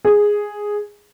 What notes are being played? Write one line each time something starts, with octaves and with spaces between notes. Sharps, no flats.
G#4